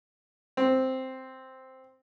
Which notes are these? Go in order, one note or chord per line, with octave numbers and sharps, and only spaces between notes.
C4